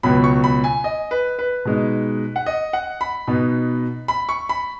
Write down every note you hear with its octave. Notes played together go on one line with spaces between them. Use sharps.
C#2 B2 F#3 B3 B5
C#6
B5
G#5
D#5
B4
B4
B2 G#3 D#4
F#5
D#5
F#5
B5
B2 B3 D#4
B5
C#6
B5